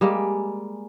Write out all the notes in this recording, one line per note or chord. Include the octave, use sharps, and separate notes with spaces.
G3 G#3 A#3